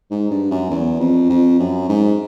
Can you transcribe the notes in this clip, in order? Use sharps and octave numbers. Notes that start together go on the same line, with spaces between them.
G#2
G2
F#2
E2
F2
F2
F#2
G#2